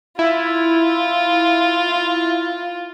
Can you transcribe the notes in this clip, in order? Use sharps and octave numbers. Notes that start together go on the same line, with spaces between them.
E4 F4